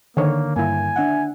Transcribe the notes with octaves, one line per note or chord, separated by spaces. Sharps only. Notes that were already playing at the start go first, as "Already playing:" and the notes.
D3 D#3 A#3 C#5
G2 A#3 E4 G#5
D4 E5 F#5